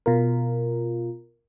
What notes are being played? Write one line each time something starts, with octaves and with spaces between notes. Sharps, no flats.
B2 F4 A#4